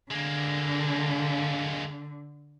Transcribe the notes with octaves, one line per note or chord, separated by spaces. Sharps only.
D3 G#3 A#3